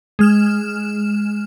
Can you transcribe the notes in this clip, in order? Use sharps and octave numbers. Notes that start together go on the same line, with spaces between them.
G#3 F6 E7